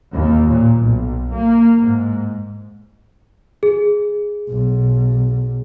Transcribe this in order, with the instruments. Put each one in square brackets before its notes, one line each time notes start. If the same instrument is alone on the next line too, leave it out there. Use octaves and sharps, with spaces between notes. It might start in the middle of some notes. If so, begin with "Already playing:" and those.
[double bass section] D#2
A#2
B1
A#3
G#2
[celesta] G#4
[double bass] B1